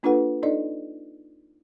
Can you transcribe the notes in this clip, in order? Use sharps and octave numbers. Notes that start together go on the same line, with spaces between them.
A#3 D4 F4 A4 B4 F#5
D4 D#4 A4 D5 D#5